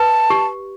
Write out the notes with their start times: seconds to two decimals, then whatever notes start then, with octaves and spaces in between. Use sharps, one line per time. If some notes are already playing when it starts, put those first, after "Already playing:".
Already playing: B4 A5
0.30 G4